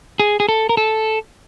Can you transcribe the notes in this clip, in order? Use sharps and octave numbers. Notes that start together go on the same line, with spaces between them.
G#4
G#4
A4
A#4
A4